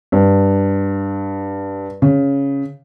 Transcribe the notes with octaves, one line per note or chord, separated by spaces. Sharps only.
G2
C#3